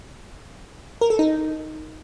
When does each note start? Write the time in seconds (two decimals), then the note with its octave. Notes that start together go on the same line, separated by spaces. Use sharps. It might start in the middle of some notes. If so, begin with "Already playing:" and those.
1.01 A#4
1.10 A4
1.19 D#4